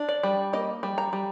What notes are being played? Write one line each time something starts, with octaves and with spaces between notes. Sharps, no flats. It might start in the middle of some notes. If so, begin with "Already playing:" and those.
Already playing: D4
D5
G3
A#3 D#5
G3
A#5
G3